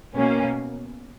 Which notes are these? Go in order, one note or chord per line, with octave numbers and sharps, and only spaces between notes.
B2 A#3 C#4